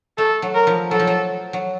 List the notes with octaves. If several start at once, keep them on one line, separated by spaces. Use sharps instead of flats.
A3 A4
F#3
A#4
F3
F#3 A4
F3
F#3
F#3